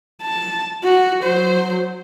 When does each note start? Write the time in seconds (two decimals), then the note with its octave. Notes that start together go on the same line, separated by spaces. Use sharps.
0.22 A5
0.83 F#4
1.24 F#3 C5